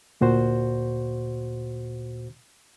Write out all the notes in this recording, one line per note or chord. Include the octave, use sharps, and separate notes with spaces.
D2 A#2 F#4 C5